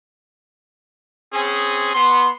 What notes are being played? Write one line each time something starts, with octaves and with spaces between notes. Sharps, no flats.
C4 C#4 G#4
B3 C6